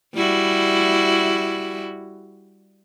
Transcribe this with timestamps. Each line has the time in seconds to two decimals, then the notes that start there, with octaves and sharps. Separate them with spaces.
0.14 G3 E4 F#4